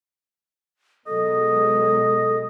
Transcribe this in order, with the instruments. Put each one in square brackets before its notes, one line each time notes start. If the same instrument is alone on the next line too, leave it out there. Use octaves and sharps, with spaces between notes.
[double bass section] B2 F#3 G#3 [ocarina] A4 [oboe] D#5